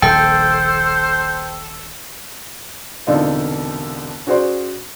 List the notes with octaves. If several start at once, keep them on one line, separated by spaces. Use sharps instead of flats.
D#1 A#1 A4 C5 G5
E1 C2 D3 D#4 F4 D5
C#4 F#4 G#4 C5 D5 C6